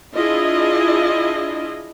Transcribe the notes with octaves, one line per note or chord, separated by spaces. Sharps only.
D4 E4 F4 G#4 D#5